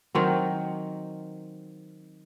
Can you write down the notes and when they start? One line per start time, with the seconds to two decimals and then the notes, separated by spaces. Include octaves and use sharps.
0.15 D#3 F#3 C4